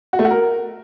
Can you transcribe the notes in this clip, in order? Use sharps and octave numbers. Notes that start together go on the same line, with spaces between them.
F#4
A3
F#4
A#4